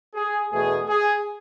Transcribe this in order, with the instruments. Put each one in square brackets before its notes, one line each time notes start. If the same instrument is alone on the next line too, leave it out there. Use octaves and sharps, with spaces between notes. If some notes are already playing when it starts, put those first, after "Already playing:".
[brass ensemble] G#4
E2 B2 A3 G#4
G#4